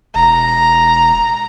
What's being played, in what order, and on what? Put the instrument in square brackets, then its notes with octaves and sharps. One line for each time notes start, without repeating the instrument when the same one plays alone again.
[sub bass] E1 [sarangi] A#5